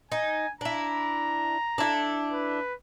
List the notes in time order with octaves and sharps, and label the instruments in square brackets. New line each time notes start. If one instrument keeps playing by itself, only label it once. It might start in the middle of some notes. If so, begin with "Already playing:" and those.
[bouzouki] D#4 [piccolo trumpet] G#5
[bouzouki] D4 E4 [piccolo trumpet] A#5
[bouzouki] D4 E4 A4
[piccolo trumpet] B4